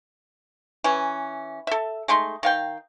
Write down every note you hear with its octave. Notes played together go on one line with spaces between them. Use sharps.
E3 C#4
A4 E5
G#3 A3 D#4 C6
D#3 F5 G5